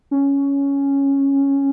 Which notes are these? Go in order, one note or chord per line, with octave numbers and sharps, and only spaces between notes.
C#4